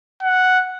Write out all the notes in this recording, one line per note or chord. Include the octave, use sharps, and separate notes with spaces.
F#5